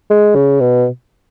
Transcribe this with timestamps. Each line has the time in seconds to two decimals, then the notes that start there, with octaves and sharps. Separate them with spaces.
0.10 G#3
0.35 C#3
0.60 B2